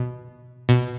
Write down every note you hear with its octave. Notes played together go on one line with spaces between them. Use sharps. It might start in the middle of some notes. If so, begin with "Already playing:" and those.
Already playing: B2
B2